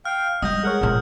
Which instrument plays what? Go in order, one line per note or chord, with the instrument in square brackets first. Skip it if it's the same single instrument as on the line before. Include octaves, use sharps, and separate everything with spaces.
[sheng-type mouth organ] F5 G5 [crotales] F6
[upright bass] G3 [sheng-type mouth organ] D#5 F6 [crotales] D#6 G6
[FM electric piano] G#3 C#5 [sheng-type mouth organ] A#4 F#5
[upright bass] A#2 C4